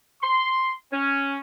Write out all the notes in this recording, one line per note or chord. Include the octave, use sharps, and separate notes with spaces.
C6
C#4